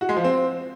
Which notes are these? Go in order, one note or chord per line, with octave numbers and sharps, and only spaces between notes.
F#4
G#3
F3
C4